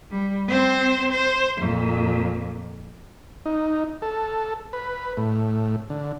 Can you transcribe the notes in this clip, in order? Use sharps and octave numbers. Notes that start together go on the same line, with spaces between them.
G3
C4 C5
C5
F2 A#2
D#4
A4
B4
A2
D3